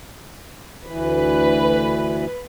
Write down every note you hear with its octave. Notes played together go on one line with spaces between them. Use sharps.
D2 E3 B4